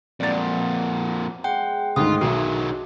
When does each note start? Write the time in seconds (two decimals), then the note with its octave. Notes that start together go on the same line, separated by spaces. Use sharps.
0.20 F2 A#2 F3 F#3 B3 D5 A6
1.44 G#3 F#5 G5
1.96 D2 G#2 D#3 D4 F4 D#6
2.21 B1 D#3 F#3 D4 F#4 D#5 E5